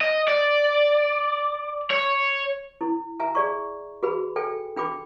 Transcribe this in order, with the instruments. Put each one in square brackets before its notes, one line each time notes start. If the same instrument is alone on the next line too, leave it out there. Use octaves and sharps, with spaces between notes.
[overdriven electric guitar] D#5
D5
C#5
[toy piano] E4
E5 G#5 A#5
G#4 D5 C#6
F#4 G#4 B4 B5
A4 G5 G#5
D4 G5 B5 D6